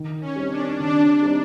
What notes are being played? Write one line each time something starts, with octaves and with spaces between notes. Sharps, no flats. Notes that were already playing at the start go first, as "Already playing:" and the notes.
Already playing: D#3
C#4
G3 C4 D#4
D4
D#3 D4
G3 C4 D#4